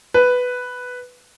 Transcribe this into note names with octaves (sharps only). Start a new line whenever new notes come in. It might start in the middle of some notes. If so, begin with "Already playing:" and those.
B4